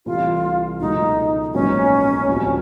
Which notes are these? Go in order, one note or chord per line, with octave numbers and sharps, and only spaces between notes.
C2 C3 E3 A3 F4
C#2 B2 F#3 A3 D#4
A#1 G#2 D#3 F#3 B3 C#4
D2 C3 F3